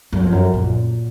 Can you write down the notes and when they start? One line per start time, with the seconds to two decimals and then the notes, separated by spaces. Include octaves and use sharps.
0.13 F#2
0.21 F2
0.32 F#2
0.54 A#2